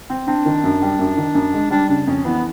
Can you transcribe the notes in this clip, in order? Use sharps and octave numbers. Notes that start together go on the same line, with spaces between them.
C4
C4 D4
D#3
F#2
G3
F#2
D#3
F#2
G#3
G3 D4
C#3 D4
F2 C#4
E3 B3